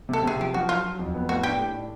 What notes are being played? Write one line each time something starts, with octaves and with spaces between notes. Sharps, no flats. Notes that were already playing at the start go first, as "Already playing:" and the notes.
C3 A4
C3 G#4
F3 G4
F3 F#4
F#3 F4
F#3
F2
B3
A2 F#4
D4 G4
A2
D4